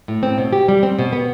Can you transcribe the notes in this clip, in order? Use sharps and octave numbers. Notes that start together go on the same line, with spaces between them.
A2
C4
B2
G4
G3
C4
B2
B3